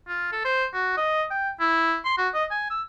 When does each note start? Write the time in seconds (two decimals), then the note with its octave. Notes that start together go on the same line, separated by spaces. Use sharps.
0.08 F4
0.32 A4
0.45 C5
0.74 F#4
0.97 D#5
1.31 G5
1.60 E4
2.05 C6
2.18 F#4
2.35 D#5
2.51 G#5
2.70 E6